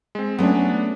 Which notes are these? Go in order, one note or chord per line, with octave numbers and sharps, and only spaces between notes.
G#3 C4
F#3 A3 B3 C#4 D4